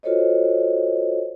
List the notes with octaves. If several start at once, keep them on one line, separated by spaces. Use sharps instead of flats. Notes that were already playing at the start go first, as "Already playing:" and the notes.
F4 F#4 A4 C5 C#5 D#5